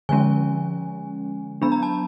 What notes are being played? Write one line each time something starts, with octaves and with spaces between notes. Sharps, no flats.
D3 F3 G#3 C#4 G#5
F#3 B3 D4 B5
A#5
A5